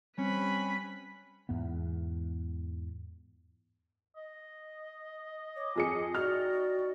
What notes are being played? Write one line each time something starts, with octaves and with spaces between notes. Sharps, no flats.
G3 C4 C#4 B4 B5
E2 G#2 B3
D#5
C#5 D6 D#6
F2 G#4 G#5 C#7
D#4 F#4 D5 G5 F6